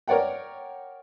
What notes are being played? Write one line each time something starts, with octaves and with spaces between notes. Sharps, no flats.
A#4 C#5 D5 F#5 G5